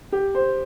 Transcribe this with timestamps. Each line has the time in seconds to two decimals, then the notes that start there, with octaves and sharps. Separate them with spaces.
0.12 G4
0.34 C5